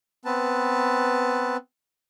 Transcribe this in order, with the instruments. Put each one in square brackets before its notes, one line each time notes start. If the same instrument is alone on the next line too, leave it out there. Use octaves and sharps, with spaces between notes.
[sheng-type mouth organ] B3 C4 B4 A5